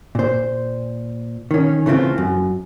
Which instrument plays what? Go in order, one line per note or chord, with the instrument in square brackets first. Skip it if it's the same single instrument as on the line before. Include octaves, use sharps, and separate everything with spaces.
[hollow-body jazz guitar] A#2 C5
D#3 C#4
C#3 E3 A3 C4 F4
F#2